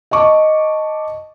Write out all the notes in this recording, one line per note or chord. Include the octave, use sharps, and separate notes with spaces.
D#5 A5 C#6 D6